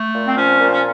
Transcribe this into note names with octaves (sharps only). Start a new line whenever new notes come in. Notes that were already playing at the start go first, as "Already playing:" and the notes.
Already playing: A3
A#2
C4
F3 C#4
A#2
C#4